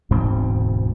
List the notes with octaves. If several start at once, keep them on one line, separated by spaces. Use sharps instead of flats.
E1 D2 G#2 C4